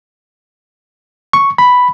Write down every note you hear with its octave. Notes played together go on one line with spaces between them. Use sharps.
C#6
B5